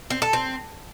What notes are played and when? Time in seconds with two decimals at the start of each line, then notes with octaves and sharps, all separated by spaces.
0.10 C4
0.22 A4
0.33 C4